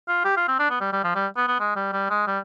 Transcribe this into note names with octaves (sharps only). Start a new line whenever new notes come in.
F4
G4
F4
C4
D4
B3
G3
G3
F3
G3
B3
B3
G#3
G3
G3
G#3
G3